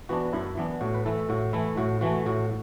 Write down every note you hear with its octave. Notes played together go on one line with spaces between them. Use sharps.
E3 B3 D4 F#4
F#2 E4
E3 B3 D4
A2 F#4
B4
E3 A3 A4
A2 F#4
E3 A3 E4
A2 F#4
E3 A3 F#4
A2 F#4